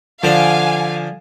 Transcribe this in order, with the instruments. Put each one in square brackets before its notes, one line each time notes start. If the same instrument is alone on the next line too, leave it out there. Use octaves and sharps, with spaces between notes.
[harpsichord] D3 D4 [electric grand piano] F3 [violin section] F5 G#5